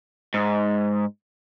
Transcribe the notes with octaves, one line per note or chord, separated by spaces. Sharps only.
G#2